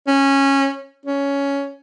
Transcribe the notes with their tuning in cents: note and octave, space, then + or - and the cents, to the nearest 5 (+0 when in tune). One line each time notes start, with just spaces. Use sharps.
C#4 -15
C#4 +10